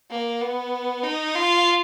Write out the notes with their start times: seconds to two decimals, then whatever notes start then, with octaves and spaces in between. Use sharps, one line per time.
0.11 A#3
0.42 B3
1.03 D#4
1.35 F4